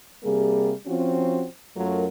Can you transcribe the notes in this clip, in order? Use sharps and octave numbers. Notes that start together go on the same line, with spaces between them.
C3 G3 A#3 G#4
F3 C4 C#4 F4 F#4
F#2 F#3 A3 F4 A#4